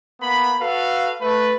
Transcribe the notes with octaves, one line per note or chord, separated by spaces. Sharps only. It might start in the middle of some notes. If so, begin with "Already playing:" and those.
A#3 B3 B5
F#4 A4 B4 F5
A3 B4